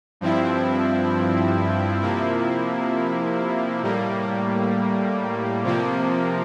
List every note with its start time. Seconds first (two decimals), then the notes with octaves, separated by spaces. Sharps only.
0.21 G2 F3 C4 E4
2.01 C3 F3 A#3 E4
3.83 A2 G3 A#3
5.64 C3 F3 A#3